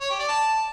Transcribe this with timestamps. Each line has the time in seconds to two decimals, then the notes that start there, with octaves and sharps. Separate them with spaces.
0.01 C#5
0.10 G4
0.19 D5
0.28 A5